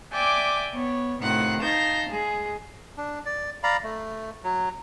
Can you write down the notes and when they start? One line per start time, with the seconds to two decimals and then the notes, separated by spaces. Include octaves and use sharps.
0.12 D5 E5 G5 G#5 D6
0.72 B3 C#5
1.19 A2 C3 D#3 F4 F#5
1.59 D#4 F5 A5 G6 A#6
2.09 G#3 G#4
2.97 D4
3.26 D5
3.63 D5 F5 A#5 B5
3.84 A3
4.44 F#3